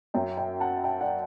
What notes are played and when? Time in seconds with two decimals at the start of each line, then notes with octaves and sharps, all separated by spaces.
0.14 F#2 F#3 E5 G5
0.37 E5 G5
0.60 F#5 A5
0.84 E5 G5
1.01 D5 F#5